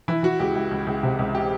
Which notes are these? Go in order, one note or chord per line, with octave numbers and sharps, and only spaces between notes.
E3 E4
E3 F#4
C#2 G4
C#2
C#2
C#2
C3
C#2
G4